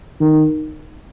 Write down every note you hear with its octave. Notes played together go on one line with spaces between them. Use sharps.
D#3